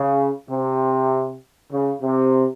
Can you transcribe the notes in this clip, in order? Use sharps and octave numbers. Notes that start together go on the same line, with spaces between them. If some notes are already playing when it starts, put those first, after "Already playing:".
Already playing: C#3
C3
C#3
C3